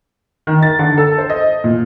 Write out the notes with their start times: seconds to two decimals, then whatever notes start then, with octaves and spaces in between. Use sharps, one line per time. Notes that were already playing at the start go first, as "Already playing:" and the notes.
0.47 D#3
0.63 A6
0.79 D3
0.98 A4
1.18 C5
1.30 D#5
1.64 A#2